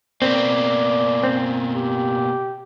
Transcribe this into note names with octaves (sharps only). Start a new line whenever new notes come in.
B2 A#3 C4 D5
C4
G4